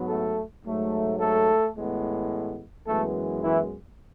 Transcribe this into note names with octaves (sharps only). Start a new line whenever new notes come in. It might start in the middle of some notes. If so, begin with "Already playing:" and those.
Already playing: G#2 F#3 B3
A3 A4
G#2 F#3 A3
A3 A4
A1 A2 G#3 B3
F#2 E3 G#3 A3 B3 A4
E3 E4